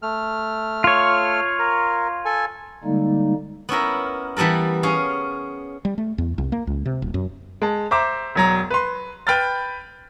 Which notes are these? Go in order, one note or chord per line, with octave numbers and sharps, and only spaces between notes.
A3 F6
F4 C#5
A#4
A4 G#5
D3 G3 G#3 A#3 D#4
B3 C#4 E4 A#4
E3 G3 B3 A4 A#4
C#4 G#4 F5
G3
A3
E2
C2
A#3
C#2
C3
D#1
F#2
G#3 A5
C5 E5 A#5 D6
E1 F#3 A#5
B4 C6
B4 G5 B5 F6 G6 A6